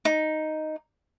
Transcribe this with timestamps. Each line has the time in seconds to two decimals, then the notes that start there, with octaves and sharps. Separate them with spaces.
0.05 D#4